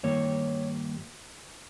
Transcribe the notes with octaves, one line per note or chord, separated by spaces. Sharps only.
G2 D#3 A#3 C#5